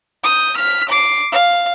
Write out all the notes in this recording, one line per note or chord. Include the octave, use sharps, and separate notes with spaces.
D#6 G6
F6 B6
D6 C7
F5